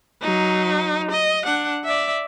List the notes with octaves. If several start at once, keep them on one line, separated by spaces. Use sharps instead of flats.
F#3 D#4
D#5
D4 F#5
D5 E5